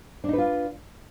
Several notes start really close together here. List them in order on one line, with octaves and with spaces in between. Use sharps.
D4 D#4 B4 F4